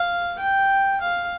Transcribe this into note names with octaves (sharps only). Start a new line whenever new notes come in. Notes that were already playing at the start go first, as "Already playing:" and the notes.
Already playing: F5
G5
F5